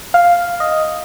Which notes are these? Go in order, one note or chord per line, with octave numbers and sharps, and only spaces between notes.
F5
D#5